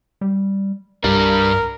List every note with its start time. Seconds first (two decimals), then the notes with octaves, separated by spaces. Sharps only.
0.21 G3
1.04 C2 G2 G3 D4 A#4